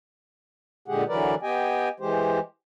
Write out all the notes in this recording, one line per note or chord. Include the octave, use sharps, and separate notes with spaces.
A#2 D3 G#3 G4 G#4 F#5
D3 E3 F#3 A#4 B4 D5
B3 G4 D#5 G5 G#5
E3 G#3 G4 C5